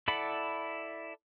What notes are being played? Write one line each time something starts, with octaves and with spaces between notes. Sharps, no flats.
E4 A4 D5 F#5 B5